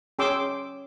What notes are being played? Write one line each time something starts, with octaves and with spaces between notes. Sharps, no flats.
C#4 G#4 G5 C6 D6 E6